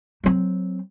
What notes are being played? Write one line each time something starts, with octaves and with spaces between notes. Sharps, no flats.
F#3 C4